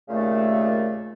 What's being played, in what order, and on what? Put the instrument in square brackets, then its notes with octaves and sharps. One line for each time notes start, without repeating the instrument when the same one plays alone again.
[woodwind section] D#2 A#2 C#3 A3